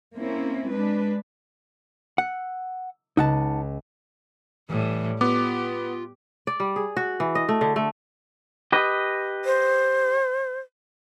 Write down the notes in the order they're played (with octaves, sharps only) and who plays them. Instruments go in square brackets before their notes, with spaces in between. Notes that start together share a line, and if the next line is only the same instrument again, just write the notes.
[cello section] A#3 C4 C#4 E4
G#3 D4 B4
[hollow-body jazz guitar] F#5 [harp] E6
[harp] C#2 [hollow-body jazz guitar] D#4 F#5 A5
[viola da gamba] A2 G3 [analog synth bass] E3
[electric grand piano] B3 [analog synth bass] F4 [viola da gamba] G4 [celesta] D6
[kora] D5
G3
G#4
F#4
E3
D#5
A3
D3
A3
[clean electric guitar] G4 B4 D#5
[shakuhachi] C5